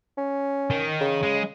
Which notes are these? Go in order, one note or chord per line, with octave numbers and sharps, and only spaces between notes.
C#4
D#3
C#3
G#3